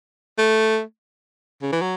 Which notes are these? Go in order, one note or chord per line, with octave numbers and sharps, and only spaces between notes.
A3
C#3
E3
F#3